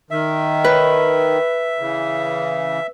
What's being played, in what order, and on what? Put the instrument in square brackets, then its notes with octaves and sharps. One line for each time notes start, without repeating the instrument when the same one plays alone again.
[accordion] D#3 [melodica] E5
[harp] B4
[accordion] C#3 E3